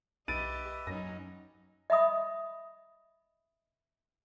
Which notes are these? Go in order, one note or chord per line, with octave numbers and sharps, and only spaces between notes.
B1 G4 B4 D#5 E5 A6 D7 D#7
F#2 F#3 C#4 D#4 A#6
D#5 E5 B5 D#6